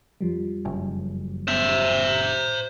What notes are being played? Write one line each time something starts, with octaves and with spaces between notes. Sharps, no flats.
F2 F3 G3
F#1
C5 E5